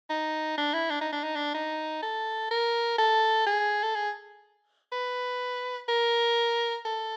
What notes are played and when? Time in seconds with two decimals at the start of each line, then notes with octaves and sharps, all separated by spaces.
0.10 D#4
0.58 D4
0.73 E4
0.90 D4
1.01 D#4
1.13 D4
1.24 D#4
1.36 D4
1.54 D#4
2.03 A4
2.51 A#4
2.98 A4
3.46 G#4
3.83 A4
3.95 G#4
4.92 B4
5.89 A#4
6.85 A4